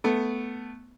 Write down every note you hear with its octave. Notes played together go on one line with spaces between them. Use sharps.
A3 B3